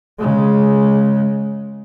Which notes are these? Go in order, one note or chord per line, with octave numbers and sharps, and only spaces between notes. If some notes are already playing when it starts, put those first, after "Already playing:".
C#3 G#3